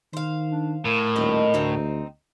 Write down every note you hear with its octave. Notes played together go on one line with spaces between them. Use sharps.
D#3 C5 F5
D4
A2 A#4
D#1 C4 D#5
D2 C4 D#4